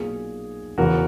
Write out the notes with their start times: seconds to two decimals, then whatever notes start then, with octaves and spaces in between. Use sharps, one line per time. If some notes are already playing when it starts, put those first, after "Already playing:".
Already playing: B1 A#2 G#4
0.78 E1 E2 C#3 E3 F#4 A#4